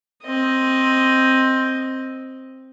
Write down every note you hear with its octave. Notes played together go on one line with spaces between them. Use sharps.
C4 D#5